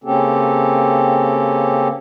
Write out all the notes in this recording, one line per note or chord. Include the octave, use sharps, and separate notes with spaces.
C#3 A#3 C4 C#4 G4 A4